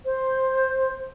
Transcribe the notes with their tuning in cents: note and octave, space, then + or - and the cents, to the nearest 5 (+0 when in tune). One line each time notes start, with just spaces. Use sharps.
C5 +5